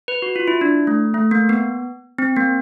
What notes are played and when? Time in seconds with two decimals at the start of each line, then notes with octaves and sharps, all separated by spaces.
0.08 B4
0.22 F#4
0.36 F4
0.48 E4
0.61 D4
0.87 A3
1.14 A3
1.31 A#3
1.49 B3
2.18 C4
2.36 A#3